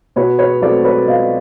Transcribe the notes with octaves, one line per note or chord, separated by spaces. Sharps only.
B2 B4 C#5
B4 C#5
F#3 A3 C4 C5 D5
B4 C#5
B2 D#5 F5